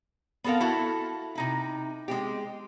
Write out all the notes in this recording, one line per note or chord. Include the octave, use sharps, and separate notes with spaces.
B3 C4 A4 A#4 F5
E4 F#4 A4
C3 D#4 E4
G#3 C4 G4